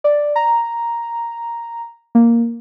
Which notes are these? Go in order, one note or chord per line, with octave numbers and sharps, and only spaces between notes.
D5
A#5
A#3